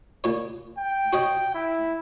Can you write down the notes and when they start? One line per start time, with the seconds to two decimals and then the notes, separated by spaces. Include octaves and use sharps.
0.24 A#2 C#5
0.78 G5
1.13 F#4 C#5 D#5
1.54 E4